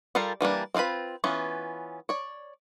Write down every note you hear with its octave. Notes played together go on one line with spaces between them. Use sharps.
G3 F4 A4 A#4 F5
E3 G3 A#3 D4
C4 D4 F4 B4 B5
E3 B3 C#4 F4
C#5 D5